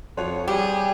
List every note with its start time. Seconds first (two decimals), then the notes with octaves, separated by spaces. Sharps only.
0.18 F2 F#4 C#5
0.48 G3 G4 G#4